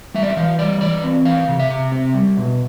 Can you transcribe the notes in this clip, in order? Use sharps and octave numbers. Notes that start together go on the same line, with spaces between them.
G3 E5
D5
E5
E3 F5
G3 D5
E3 D5
C4
E3 F5
C3
E5
C3
C4
G3
B2